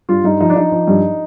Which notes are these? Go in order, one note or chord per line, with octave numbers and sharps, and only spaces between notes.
G2 F4
G2 D#4
F3 D#4
D4
F3 D#4
F3
G2